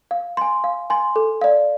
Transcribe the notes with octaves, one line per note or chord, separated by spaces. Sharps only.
F5
G#5 C6
F5
G#5 C6
A4
D5 F5